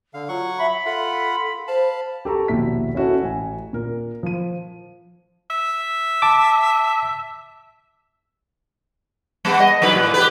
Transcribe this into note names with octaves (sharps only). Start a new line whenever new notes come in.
D3 F5
F#3 F4 F#5 C#6
E5 B5
F4 A4 F#5
C5 F5 A5 B5
G4 A4 A#5 C#6
A#1 D#2 B2 E4 E5 B6
C#4 E4 F#4 A4 C#5
A1 G#5
A#2 A#4
F3 D#7
E5
A5 D6
G3 B3
D#5
F#3 D#4 B4
A2
G4 B4